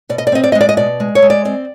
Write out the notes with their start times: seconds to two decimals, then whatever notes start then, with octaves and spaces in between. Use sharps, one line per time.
0.09 B2 D5
0.18 D#5
0.27 D5
0.32 C4 D#5
0.44 D5
0.52 D#5
0.55 G#3
0.61 D5
0.69 D#5
0.77 B2 D5
1.00 G#3
1.15 C#5
1.22 G#3
1.30 D5
1.45 C4 D5